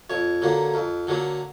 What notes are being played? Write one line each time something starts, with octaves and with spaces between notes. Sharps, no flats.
F2 C#5
D3 F#3 A#3
F2
D3 F#3 A#3